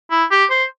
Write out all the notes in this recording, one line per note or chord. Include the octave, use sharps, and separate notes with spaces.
E4
G4
C5